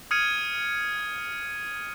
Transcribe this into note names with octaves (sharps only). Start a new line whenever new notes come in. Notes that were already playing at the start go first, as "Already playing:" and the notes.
D#6 F6 G#6 C#7 D#7